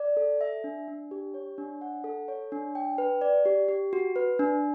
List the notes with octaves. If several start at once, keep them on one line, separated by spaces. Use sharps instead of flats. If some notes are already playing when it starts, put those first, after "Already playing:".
Already playing: D5
A4
E5
D4
D4
G4
C#5
D4
F#5
A4
C#5
D4
G5
B4
D5
G4
G4
F#4
B4
D4